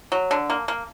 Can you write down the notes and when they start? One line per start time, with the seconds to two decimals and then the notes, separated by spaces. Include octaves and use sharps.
0.12 F#3
0.31 D3
0.50 A#3
0.68 A#3